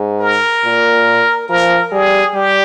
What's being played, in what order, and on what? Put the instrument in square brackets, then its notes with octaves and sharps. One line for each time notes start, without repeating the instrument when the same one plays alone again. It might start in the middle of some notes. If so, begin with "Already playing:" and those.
Already playing: [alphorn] G#2
[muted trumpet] A#4
[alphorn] A#2
[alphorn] F3 [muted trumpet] A#4
[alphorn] G3 [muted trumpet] G#4
[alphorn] G3 [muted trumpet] G4